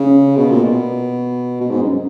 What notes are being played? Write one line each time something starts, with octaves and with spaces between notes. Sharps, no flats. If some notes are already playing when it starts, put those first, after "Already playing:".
Already playing: C#3
B2
A#2
B2
B2
G#2
F#2